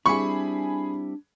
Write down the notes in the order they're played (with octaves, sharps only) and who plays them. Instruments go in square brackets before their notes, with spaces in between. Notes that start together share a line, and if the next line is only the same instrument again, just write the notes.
[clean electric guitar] G3 C4 E4 [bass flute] D4 [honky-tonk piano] G#4 B5 [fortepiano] C#6